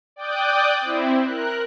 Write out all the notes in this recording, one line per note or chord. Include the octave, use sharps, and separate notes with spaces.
D5 G5 D6 D#6 F#6 G6
C4 E4
A#4 F#6